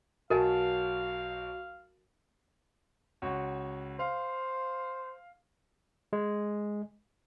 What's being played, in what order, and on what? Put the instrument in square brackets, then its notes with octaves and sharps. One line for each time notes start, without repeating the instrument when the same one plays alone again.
[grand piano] B1 F#3 A5 [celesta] F#4 [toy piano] A#4 D#5 G#5 [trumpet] F5
[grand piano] C#2 F#4 C#5
[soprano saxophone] C5 [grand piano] F5
[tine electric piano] G#3